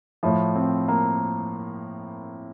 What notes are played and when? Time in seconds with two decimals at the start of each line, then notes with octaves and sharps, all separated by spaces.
0.23 A2 F3 E4
0.55 C4
0.88 A#3